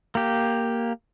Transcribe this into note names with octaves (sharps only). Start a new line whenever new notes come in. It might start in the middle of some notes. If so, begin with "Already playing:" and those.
A#3 G4